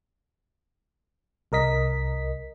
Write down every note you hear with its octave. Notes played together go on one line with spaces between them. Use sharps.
C2 A#4 D#5 B6